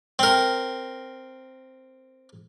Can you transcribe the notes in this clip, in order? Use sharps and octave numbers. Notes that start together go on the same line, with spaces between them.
C4 A#4